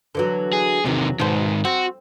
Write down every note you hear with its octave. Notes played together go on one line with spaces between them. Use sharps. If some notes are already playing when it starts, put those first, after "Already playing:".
D3 E3 F#3
G#4
E2 C3 D#3 F#3
G#2 B2 D#3 C5
C4 F#4